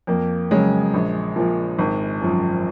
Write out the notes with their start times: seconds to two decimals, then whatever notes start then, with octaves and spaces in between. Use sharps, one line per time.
0.07 F2 A#3
0.51 C#3 F#3 G#3
0.94 A#1
1.36 A#2 F3
1.79 G#1
2.22 F#2 F3